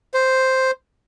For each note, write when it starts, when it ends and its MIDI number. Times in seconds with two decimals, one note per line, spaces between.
0.14 0.71 72